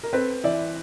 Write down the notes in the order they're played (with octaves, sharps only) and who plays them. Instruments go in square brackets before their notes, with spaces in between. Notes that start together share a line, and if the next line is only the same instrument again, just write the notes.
[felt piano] A#4
[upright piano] C4 [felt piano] A4 B4
[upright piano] E3 [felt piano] D5 E5